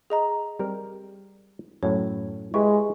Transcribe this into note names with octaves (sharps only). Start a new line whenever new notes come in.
G#4 D#5 A#5
G3 C4 A#4
F#2 A2 C#5
G#3 E4 G4 B4 C#6